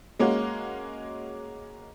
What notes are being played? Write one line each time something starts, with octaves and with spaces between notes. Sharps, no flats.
G#3 A#3 C#4 F#4